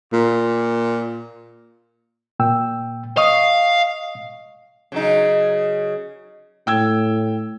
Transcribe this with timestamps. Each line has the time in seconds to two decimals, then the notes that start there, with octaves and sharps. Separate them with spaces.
0.13 A#2
2.40 A#2 G5 E6
3.17 D#5 F5 C#6 D#6
4.92 C#3 F#3 D#4
6.67 A2 G5 E6 G#6